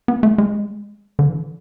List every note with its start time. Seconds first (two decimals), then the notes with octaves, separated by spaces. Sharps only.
0.08 B3
0.23 A3
0.38 G#3
1.19 D3
1.29 E3